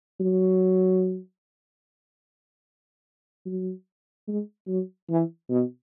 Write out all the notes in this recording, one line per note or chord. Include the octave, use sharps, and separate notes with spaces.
F#3
F#3
G#3
F#3
E3
B2